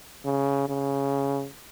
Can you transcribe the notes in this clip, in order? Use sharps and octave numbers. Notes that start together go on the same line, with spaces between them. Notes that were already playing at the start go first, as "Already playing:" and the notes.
C#3
C#3